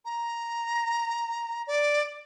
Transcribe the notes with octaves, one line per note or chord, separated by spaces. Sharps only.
A#5
D5